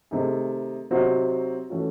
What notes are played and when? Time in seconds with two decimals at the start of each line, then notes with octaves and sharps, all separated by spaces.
0.11 C3 D#3 A3 D#4 G#4
0.91 C3 F#3 C4 D#4 F#4
1.70 E3 A3 C#4 F#4